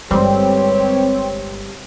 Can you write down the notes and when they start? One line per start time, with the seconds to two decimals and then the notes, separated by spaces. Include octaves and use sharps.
0.11 G1 G3 G#3 C4 G4 B4 C#5